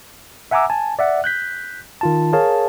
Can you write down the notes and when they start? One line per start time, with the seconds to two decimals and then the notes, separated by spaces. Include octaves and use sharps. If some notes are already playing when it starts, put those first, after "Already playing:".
0.51 E5 F#5 G#5 A#5 D6 E6
0.70 G#5 A5
0.99 D5 E5 F#5
1.24 F#6 G6 B6
2.01 D#3 F4 A5
2.33 G#4 A#4 C#5 F5 A5